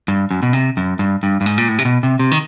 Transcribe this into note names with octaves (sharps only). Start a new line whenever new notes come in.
G2
F#2
B2
C3
F#2
G2
G2
G2
G#2
A#2
A2
C3
B2
C3
C3
D#3